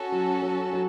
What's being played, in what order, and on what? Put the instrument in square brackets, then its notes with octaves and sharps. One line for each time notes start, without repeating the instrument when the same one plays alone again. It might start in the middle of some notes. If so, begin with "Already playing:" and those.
Already playing: [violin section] C#4 F#4 A4
[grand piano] F#3
F#3
F#3